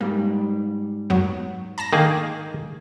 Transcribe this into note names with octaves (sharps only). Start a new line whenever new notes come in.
G#2 G3 A#3
F#2 F#3 B3
A5 A#5 A#6
D3 D#3 A#3 G#4